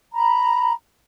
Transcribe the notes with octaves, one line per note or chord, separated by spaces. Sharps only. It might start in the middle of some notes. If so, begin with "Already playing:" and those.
A#5 B5